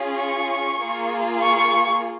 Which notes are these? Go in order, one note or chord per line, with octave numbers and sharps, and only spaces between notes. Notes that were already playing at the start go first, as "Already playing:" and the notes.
Already playing: C#4 F4 G#4
C#6
A#3 F4 G#4
C#6